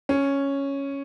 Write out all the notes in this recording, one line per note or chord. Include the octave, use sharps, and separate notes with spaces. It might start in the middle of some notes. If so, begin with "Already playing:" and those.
C#4